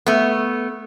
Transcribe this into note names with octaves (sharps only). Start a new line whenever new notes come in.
A3 B3